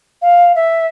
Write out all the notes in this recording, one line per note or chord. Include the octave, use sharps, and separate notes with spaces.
F5
E5